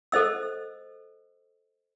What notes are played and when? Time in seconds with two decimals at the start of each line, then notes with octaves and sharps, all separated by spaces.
0.12 A4 C5 D#5 E6